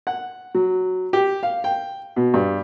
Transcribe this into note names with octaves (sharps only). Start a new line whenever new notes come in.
F#5
F#3
G4
F5
G5
B2
G2